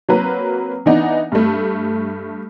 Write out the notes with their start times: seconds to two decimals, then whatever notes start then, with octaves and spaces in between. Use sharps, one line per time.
0.09 F#3 A#3 C4 B4 A#5
0.86 E3 B3 D4 D#4
1.32 G2 A3